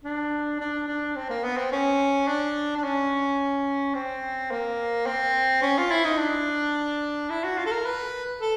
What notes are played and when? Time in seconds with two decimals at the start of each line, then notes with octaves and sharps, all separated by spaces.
0.04 D4
0.60 D4
0.88 D4
1.16 C4
1.30 A#3
1.44 B3
1.57 C4
1.72 C#4
2.28 D4
2.77 D4
2.84 C#4
3.95 C4
4.51 A#3
5.07 C4
5.62 C#4
5.78 F4
5.91 E4
6.05 D#4
6.18 D4
7.30 E4
7.44 F#4
7.58 F4
7.66 A4
7.72 A#4
7.86 B4
8.41 A4